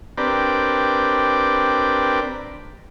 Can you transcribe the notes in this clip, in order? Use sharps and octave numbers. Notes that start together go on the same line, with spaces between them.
C4 D4 G4 A#4 B4 D5